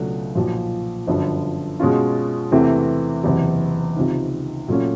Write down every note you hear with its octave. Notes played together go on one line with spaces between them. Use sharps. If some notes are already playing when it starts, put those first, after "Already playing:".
Already playing: C#2 B2 F#3 A3 D4
B1 A#2 F3
G1 F#2 D3 F3
B2 G#3 C#4 F4
E2 C3 E3 A3 C4
F#1 E2 C3
C#2 C3 D#3
A#2 F#3 A3 C#4